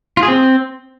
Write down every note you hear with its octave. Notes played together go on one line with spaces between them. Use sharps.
F4
G#4
C4